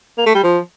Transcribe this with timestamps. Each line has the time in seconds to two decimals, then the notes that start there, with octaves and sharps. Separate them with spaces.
0.18 A#3
0.26 A3
0.35 G3
0.43 F3